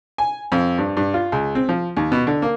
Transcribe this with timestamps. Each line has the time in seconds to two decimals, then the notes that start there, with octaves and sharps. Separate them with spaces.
0.18 G#5
0.52 F2
0.78 G2
0.97 G2
1.14 F4
1.32 C#2
1.55 C4
1.69 F3
1.97 D#2
2.12 B2
2.27 D3
2.42 A#3